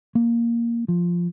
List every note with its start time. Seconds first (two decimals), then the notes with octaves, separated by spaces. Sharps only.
0.15 A#3
0.88 F3